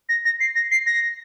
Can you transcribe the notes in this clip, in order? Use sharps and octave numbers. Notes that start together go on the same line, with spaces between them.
A#6
A#6
C7
A#6
C7
A#6